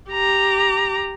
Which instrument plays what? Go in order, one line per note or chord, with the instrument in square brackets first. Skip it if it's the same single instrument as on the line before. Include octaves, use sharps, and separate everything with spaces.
[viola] G4 A#5